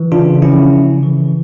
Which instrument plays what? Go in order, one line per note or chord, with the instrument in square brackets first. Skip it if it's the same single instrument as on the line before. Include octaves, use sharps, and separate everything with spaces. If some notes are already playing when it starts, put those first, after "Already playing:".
Already playing: [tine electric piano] E3
C#3 D4 F4
F3 C#4 E4
C#3
E3